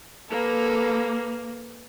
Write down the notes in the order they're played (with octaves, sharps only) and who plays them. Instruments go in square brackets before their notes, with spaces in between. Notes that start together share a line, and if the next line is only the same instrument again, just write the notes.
[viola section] A#3 [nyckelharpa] A4 B4